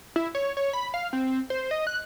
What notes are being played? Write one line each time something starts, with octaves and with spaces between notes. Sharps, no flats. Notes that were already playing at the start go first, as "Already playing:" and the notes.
E4
C#5
C#5
B5
F5
C4
C5
D#5
F#6